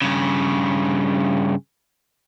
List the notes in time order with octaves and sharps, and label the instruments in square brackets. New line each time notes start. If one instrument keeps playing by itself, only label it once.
[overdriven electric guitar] G2 C#3